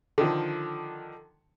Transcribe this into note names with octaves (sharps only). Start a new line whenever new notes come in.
D3 D#3 F3